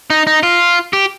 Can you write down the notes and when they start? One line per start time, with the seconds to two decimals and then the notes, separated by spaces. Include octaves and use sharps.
0.10 D#4
0.27 D#4
0.43 F4
0.93 G4